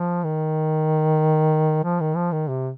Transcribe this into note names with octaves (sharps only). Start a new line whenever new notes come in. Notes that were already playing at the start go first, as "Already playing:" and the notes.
Already playing: F3
D#3
F3
D#3
F3
D#3
C3